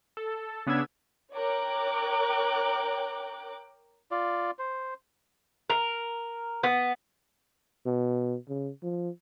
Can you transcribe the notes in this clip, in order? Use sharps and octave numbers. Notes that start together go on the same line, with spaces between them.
A4
C#3 B3 D4 E6 G#6
A#4 C#5 G5 D6 F#6
F4 D5
C5
A#4
B3
B2
C#3
F3